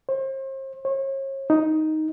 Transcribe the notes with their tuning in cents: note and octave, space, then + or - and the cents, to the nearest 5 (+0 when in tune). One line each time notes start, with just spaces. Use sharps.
C5 +40
C#5 -40
D#4 +5